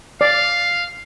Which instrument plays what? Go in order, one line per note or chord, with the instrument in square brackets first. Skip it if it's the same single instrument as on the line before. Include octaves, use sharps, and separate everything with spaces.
[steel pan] D5 [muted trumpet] F5